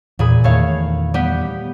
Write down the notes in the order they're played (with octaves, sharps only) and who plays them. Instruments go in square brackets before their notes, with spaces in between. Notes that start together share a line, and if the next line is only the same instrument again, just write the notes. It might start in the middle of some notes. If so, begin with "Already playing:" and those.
[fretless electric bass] E2 [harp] A#2 G#4 B5
[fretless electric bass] E2 D#3 [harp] A3 C#5 F5
[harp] G3 B3 G4